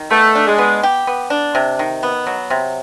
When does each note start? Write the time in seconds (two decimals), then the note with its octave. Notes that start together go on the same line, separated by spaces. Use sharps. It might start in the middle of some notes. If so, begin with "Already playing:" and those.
Already playing: D#3
0.10 A3 B3
0.35 D4
0.47 G#3
0.58 B3
0.83 G4
1.07 B3
1.30 D4
1.55 C3
1.79 D#3
2.03 B3
2.26 F#3
2.50 C3